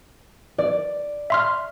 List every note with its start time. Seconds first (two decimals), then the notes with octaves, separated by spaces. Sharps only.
0.58 D5
1.30 E5 C6 F6